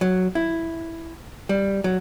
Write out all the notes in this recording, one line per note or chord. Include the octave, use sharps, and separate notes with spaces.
F#3
E4
G3
F#3